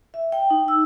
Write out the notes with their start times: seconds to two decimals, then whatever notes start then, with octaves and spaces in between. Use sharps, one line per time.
0.14 E5
0.32 G5
0.50 D#4
0.68 E6